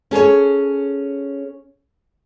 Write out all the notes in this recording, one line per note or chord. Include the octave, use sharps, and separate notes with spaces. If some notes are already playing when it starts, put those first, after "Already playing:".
C#4 G#4 A4 C#5